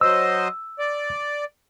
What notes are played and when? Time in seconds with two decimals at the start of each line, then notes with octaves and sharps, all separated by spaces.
0.01 F#3 C5 D#5 E6
0.79 D5